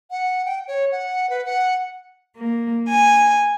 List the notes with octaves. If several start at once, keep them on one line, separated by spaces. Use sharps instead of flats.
F#5
G5
C#5
F#5
B4
F#5
A#3
G#5